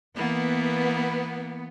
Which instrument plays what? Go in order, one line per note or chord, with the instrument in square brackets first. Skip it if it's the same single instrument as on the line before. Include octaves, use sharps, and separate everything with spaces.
[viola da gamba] E3 A#3 [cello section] B3